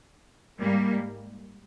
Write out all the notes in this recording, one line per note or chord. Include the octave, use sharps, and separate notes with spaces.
G#2 G3 A#3